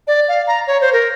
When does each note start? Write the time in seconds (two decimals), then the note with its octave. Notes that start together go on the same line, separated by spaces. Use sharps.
0.07 D5
0.28 F5
0.47 A#5
0.67 C#5
0.81 C5
0.93 A#4